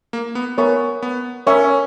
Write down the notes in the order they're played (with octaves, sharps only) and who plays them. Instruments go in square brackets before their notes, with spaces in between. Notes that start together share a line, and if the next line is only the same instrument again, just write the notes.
[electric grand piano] A#3
B3
[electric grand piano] B3 [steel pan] A#4 C#5 E5 G#5 C#6
[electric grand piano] B3
[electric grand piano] C#4 [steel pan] A#4 C#5 E5 G#5 C#6